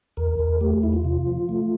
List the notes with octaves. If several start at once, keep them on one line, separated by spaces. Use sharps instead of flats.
E2 A#4
E2
A3 G4
E2 E4
F4
C3
F3
A3